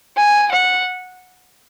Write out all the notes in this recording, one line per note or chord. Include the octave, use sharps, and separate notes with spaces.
G#5
F#5